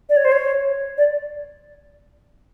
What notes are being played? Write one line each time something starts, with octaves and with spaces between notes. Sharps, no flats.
D5
C#5
C5
C#5
D5